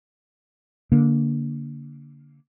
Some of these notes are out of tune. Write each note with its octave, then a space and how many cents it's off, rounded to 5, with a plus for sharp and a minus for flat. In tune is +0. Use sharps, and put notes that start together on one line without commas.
D3 -20 A#3 +0